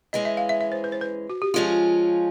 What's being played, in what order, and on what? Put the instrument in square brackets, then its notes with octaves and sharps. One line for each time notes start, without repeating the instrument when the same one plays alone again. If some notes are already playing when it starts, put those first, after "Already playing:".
[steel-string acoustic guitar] E3 G#3 C#4 [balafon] D#5
[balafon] E5
F5
E5
E5
C5
B4
C5
B4
F#4
G4
[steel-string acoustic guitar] F3 G#3 C#4 F4 [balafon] G#4